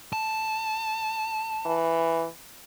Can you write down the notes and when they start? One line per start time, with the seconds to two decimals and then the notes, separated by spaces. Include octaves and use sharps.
0.13 A5
1.66 E3